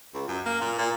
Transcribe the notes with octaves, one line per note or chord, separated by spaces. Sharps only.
C#2
F#2
A#3
A#2
A#2